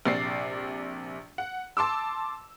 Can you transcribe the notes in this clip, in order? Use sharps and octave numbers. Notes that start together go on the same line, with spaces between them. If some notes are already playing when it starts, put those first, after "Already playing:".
A#1 C3 D5 A6 C7
F#5
A5 C6 D6 E6